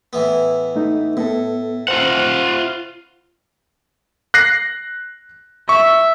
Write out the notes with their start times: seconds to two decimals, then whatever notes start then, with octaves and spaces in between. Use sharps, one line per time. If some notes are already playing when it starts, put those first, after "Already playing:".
0.13 A2 E3 B3
0.76 A3 D#4
1.17 A2 B3 A4
1.88 F4 C5 F#5
4.34 F#6 A#6 C7
5.69 E5 C#6